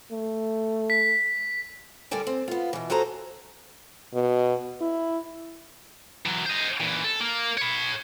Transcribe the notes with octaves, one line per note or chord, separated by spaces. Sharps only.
A3
B6
D3 G3 A4 A#4 D5 G#5
C4
B3 F4
B2 E3
F#4 G#4 A4 C5 A#5
B2
E4
E3 F#3
C5 D#5
A#2 E3
A4
A#3
C#5 B5